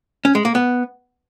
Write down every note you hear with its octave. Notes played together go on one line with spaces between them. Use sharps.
C#4
G#3
A#3
B3